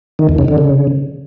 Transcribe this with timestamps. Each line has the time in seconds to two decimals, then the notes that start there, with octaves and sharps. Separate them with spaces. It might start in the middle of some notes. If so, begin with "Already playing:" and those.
0.19 D#3
0.29 E2
0.38 C#3
0.48 D3
0.58 C#3